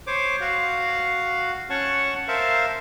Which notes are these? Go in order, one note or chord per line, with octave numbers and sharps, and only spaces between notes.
C5 C#5 D6
F#4 F5
C#4 C#5 F#5 A5 C#6
A#4 C5 E5 F5 A5